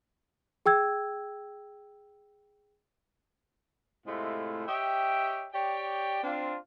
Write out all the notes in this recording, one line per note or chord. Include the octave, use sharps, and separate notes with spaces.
G#4 G5 E6 G#6
A2 C3 G#3 A3 E4 F4
G4 C#5 D#5 E5 G5
G4 C#5 D5 G5
C4 D4 F4